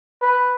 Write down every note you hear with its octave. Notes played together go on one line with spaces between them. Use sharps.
B4